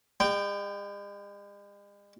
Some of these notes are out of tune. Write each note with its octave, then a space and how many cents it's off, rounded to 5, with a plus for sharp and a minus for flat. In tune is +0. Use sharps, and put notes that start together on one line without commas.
G#3 -45 G5 +0